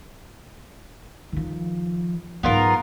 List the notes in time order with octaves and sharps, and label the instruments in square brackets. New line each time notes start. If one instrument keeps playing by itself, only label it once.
[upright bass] D#3 F3
[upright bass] G#2 F#3 [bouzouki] B3 F4 A#4